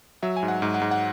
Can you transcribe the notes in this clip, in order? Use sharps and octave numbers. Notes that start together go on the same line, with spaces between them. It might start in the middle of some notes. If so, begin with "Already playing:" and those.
F#3 E5
G#5
G#2
F#5
G#2
F#5
G#2
F#5